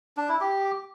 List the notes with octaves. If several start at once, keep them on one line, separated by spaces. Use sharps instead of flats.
D4
E4
G4